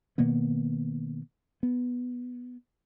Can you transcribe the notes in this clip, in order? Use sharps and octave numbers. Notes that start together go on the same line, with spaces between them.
B2 D#3 A#3 B3
B3